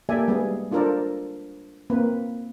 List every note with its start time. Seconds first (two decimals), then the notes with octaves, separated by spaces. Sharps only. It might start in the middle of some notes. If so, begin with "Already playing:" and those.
0.09 A#3 G4 A4 D5 E5 G#5
0.28 G3 G#3 B3 G#4
0.71 D4 F4 A4 A#4 C5 D5
1.90 A#3 C4 B4